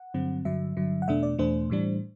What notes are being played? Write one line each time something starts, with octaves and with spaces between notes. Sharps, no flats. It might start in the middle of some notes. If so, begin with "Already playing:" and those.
Already playing: F#5
G2 D3 F#3 C4
G2 D3 F#3 E5
G2 D3 F#3
F#5
E2 B2 A3 D4 E5
D5
E2 B2 A3 D4 C5
A2 E3 G3 D4